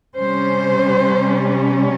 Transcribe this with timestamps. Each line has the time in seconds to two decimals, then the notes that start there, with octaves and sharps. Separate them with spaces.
0.16 C3 G3 C#4 C5